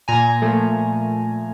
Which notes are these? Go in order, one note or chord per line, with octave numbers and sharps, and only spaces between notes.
A#2 G#5 A#5
F3 A3